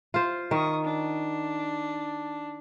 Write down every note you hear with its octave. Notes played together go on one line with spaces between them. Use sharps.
F4 C5
D#3 C#6 D#6
D4